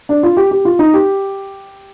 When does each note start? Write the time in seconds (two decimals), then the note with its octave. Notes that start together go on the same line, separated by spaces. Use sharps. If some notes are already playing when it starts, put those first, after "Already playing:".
0.09 D4
0.23 F4
0.37 G4
0.51 G4
0.65 F4
0.79 D#4
0.94 G4